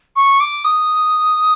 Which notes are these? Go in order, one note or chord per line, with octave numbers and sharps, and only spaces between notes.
C#6
D6
D#6